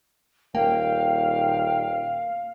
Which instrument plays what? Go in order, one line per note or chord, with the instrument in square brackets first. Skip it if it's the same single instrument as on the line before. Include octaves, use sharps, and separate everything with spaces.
[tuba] D#1 [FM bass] A#3 [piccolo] F5 [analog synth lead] G5